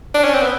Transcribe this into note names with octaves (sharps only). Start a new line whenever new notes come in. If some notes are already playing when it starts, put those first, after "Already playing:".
D4
C#4
C4
B3